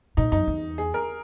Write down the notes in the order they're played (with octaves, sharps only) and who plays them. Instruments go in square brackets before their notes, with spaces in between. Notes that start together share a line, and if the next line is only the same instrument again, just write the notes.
[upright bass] A#2 [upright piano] D#4
[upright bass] F#2 [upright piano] D#4
[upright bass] E2
[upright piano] G#4
A#4